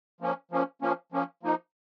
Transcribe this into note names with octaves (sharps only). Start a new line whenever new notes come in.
F3 A#3 C#4
F3 A#3 C#4
F3 A#3 C#4
F3 A#3 C#4
F3 A#3 D#4